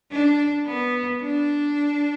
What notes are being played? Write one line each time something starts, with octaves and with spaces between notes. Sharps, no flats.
D4
B3
D4